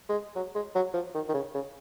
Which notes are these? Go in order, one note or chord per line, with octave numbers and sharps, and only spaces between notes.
G#3
F#3
G#3
F#3
F3
D#3
D#3
C#3
C#3